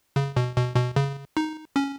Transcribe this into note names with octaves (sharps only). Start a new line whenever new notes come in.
C#3
B2
B2
B2
C#3
D#4
C#4